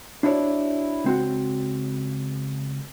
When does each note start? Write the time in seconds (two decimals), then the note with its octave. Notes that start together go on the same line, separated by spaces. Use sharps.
0.23 D4 E4 F#4 A4 C#5 D5
1.04 C#2 C4 F#4